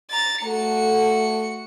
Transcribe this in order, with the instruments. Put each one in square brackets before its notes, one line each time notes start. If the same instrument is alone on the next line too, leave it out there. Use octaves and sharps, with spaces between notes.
[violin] A#5 A6
[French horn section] A3 A4 [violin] F#4 C#7